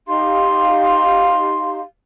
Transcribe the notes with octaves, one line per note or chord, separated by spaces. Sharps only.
D#4 G4 F5 C6